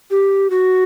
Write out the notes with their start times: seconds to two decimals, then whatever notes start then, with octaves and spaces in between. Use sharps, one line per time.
0.11 G4
0.50 F#4